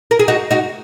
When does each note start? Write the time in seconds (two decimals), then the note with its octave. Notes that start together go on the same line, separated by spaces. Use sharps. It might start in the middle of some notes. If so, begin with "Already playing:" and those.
0.11 A#4
0.19 G#4
0.28 D#4 F#4
0.51 D#4 F#4